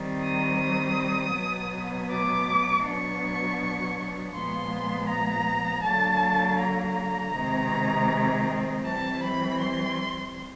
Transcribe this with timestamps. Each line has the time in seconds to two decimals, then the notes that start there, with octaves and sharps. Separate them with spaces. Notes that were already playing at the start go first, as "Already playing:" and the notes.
Already playing: D#3 G3 C4
0.23 D#6
1.35 B2 F#3 B3
2.11 D6
2.85 B2 F#3 B3 D4 C#6
4.35 A#2 F3 G#3 B3 C6
5.10 A#5
5.85 D3 F#3 A#3 A5
6.60 A#5
7.35 C3 D#3 G#3 C4
8.85 E3 G3 C4 A5
9.23 B5
9.60 C6